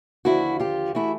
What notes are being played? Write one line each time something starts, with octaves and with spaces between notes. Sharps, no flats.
D#2 D3 F3 E4 F#4
F4 G4
E3 A3 E4 F#4